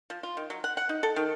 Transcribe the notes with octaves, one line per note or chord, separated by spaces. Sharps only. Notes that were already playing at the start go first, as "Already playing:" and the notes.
F3
F4
D#3
F#3
F#5
F#5
D#4
A4
D#3